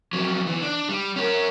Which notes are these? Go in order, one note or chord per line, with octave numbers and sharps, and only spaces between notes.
F2 F#3
E2 E3
D4
G3
C#4 A#4